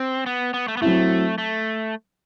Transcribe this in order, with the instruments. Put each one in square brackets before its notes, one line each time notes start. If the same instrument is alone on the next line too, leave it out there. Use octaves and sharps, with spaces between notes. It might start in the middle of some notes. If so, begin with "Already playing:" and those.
Already playing: [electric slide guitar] C4
B3
B3
A3
B3
[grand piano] F#3 C4 E4 [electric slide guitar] A3
[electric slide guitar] A3